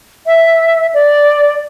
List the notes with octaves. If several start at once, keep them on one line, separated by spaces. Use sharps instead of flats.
E5
D5